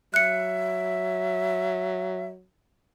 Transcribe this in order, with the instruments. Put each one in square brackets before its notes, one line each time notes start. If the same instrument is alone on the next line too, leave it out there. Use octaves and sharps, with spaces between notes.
[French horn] F#3 [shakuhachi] E5 [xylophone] F#6 C#7